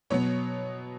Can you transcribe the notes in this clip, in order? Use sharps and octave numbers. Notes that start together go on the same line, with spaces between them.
B2 F#3 B3 C#5